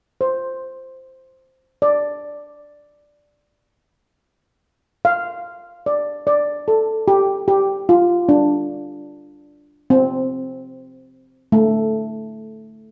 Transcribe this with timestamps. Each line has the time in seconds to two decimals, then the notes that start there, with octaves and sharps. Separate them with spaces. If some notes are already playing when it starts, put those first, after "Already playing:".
0.21 C5
1.82 D5
5.05 F5
5.86 D5
6.27 D5
6.68 A4
7.08 G4
7.48 G4
7.89 F4
8.29 D4
9.90 C4
11.52 A3